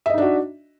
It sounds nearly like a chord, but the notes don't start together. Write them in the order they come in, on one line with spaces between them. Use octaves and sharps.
E5 D#5 D#4 D4 F#4